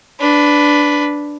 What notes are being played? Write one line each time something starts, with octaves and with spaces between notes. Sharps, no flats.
D4 B4